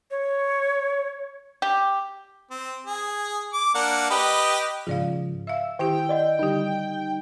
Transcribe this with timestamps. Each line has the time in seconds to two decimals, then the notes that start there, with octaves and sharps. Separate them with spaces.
0.11 C#5
1.62 G4
2.50 C4
2.86 G#4
3.53 D6
3.75 A#3 D4 F#5
4.10 G4 B4 D#5
4.87 G#2 C#3 F3 G#4 D5 F5
5.47 E5 F5 E6
5.79 D#3 E4 G4 G5
6.09 D5 D#5 F#5
6.39 D3 G3 D#4 G4